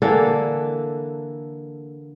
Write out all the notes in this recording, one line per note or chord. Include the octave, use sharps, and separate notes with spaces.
D3 E3 A#3 A4